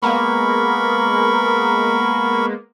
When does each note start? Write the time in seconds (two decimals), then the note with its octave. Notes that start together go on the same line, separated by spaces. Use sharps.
0.02 G#3 A#3 B3 A#4 B5 C#6